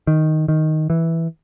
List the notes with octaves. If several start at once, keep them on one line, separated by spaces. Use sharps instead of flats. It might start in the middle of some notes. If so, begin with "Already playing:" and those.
D#3
D#3
E3